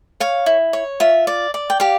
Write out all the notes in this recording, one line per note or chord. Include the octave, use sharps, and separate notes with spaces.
C#5 F5
E4
C#5
F4 E5
D5
D5
G5
G4 F5